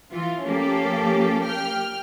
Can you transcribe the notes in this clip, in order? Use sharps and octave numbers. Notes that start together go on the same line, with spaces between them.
E3 F4
F3 A#3 C#4 G4 A4
G5 F6